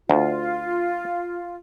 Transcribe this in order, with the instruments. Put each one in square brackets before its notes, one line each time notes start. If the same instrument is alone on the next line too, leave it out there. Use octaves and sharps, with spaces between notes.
[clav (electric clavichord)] D2 [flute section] F4